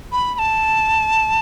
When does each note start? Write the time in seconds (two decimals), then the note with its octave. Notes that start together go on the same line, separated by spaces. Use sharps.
0.12 B5
0.35 B5
0.39 A5